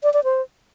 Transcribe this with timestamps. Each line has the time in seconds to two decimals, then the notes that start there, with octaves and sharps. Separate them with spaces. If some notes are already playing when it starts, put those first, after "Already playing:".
0.03 D5
0.14 D5
0.24 C5